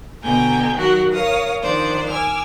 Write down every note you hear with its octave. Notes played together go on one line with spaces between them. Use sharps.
B2 D3 G5 G#5 A#5
D#3 F#3 F#4 A#4 F#5
A#4 C#5 F5 D#6
D#3 F3 D4 C5 D5
G#5 D6 E6 F6